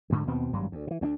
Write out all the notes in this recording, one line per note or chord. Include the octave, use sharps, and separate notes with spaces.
D2 G#2 D3
D#2 B2 B3 C4
G#1 G2 F#3 G3
D2
B2 E3
D2 B3 D4